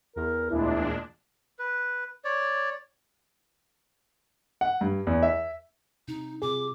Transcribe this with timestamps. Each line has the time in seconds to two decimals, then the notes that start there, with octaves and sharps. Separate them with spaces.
0.16 E2 A#4
0.50 D2 A#2 G#3 D4 E4
1.59 B4
2.24 C#5 D5
4.61 F#5
4.81 G2
5.07 E2
5.23 E5
6.08 C3 D#4
6.42 C3 F4 G#4 D6